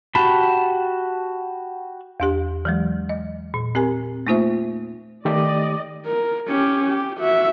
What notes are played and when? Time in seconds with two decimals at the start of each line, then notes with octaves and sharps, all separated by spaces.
0.15 F#4 G4 A5 B5
2.20 E2 D4 G4
2.65 E3 F#3 G#3
3.09 D#5
3.54 A#2
3.75 C4 G4 A#4 G#5
4.27 A3 A#3 D#4 F4 C5 E5
5.25 D#3 A3 G4 D5 D#5
6.06 A#4
6.48 C#4 G4
6.86 G4
7.18 F#4 E5